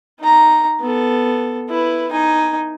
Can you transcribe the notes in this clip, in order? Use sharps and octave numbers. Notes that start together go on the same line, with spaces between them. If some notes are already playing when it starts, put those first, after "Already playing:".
D#4 A#5
B3 A4
E4 B4
D#4 G#5